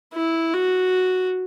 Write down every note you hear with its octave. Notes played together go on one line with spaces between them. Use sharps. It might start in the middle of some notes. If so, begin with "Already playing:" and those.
E4
F#4